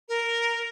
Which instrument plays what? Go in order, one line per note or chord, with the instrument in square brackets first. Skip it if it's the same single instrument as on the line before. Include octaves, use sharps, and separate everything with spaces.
[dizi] A#4